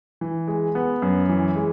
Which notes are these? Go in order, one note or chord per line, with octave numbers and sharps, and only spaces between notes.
E3
G#3
B3
F#2
E3
G#3